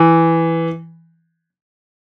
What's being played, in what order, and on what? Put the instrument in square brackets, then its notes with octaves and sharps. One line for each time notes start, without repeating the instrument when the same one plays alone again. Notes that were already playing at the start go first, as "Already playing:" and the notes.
Already playing: [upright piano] E3